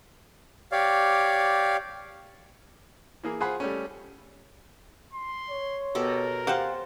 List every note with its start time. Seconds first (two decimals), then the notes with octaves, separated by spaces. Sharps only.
0.72 G4 C#5 D5 F5
3.23 E3 A#3 G#4
3.40 F4 G#4 C5 F#5 G#5 B5
3.60 G3 A3 C#4
5.13 C6
5.49 C#5
5.95 B2 G4 A4 A#4
6.47 G4 C5 F5 F#5 A5